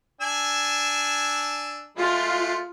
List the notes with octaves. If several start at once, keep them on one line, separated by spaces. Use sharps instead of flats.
D4 G#5 E6
G#3 A3 F4